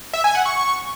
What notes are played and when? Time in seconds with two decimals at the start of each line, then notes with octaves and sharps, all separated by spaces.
0.14 E5
0.24 G#5
0.35 F#5
0.46 C#6